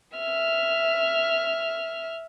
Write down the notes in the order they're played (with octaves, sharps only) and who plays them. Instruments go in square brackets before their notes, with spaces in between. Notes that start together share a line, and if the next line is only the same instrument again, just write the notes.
[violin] E5 F6